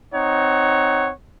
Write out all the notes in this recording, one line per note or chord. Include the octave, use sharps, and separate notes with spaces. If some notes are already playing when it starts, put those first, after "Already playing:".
C4 D#4 C#5 F#5